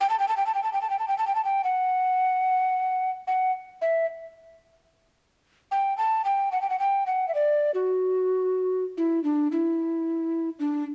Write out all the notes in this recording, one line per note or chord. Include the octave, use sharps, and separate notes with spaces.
G5
A5
G5
A5
G5
A5
G5
A5
G5
A5
G5
A5
G5
A5
G5
A5
G5
F#5
F#5
E5
G5
A5
G5
F#5
G5
F#5
G5
F#5
E5
D5
F#4
E4
D4
E4
D4